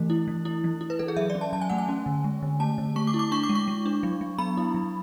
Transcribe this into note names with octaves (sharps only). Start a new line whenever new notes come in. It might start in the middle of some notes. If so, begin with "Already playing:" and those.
Already playing: E3 A3
E4
E3
E4
E3
E4
B4
E3 A4
G#4
F#3 E5
D5
C#4
A5
F#3 A5
G#5
A3 F#5
G#5
C#4
D3
G#3
D3
A3 A5
D3
A3 C#6
D6
E4
D6
D4 C#6
D6
G#3
C#6
G#3
D4
F#3
F#3
B3 B5
E4
F#3